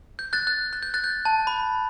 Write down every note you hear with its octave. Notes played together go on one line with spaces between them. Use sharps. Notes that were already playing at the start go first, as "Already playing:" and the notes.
G6
F#6 A6
F#6
F#6
G6
F#6 A6
G6
A5
B5